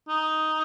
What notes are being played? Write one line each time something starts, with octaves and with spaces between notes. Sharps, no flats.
D#4